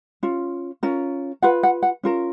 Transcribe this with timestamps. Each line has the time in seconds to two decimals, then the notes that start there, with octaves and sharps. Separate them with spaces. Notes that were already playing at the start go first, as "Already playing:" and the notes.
0.23 C#4 F4
0.83 C#4 F4 A#4
1.42 F4 B4 F#5
1.63 F#5
1.83 F#5
2.03 C#4 F4 A#4